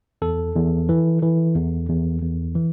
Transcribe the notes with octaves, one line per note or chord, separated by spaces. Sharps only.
E2 A4
E2
E3
E3
E2
E2
E2
E3